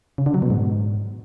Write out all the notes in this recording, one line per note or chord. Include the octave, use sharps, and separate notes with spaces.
C#3
D3
F#3
B2
G#2